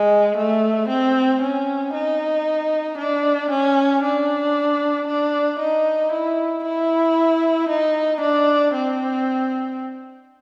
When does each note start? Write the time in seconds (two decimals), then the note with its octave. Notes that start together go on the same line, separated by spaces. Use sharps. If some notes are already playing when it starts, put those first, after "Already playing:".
Already playing: G#3
0.37 A3
0.88 C4
1.42 C#4
1.93 D#4
2.98 D4
3.50 C#4
4.03 D4
5.07 D4
5.59 D#4
6.12 E4
6.64 E4
7.69 D#4
8.21 D4
8.74 C4